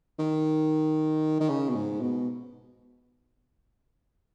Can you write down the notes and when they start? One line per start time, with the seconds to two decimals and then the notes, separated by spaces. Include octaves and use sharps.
0.19 D#3
1.41 D#3
1.49 C#3
1.69 B2
1.75 G#2
2.01 B2